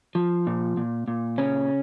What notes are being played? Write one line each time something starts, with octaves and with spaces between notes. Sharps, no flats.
F3
A#2
A#2
A#2
C#3 C#4